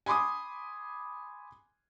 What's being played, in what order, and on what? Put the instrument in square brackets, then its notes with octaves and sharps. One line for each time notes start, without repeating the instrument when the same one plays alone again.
[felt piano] G#5 B5 C6 D6 D#6